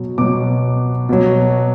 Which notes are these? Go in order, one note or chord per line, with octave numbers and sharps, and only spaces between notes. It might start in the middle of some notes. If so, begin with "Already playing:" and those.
Already playing: B2 F#3
B2 F#3 D6
B2 F#3